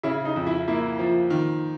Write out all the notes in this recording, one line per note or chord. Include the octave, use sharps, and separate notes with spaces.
C#3 E4
D#4
F2
E4
A#3 E4
F3
D#3